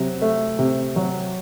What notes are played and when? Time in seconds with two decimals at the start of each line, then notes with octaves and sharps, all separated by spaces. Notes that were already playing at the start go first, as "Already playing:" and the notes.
Already playing: C3 F#3
0.22 A3
0.59 C3
0.96 F#3